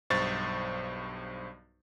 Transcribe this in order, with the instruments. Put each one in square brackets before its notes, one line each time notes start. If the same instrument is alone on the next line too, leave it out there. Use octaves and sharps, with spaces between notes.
[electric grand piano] B1 G2 C5 C#6 A6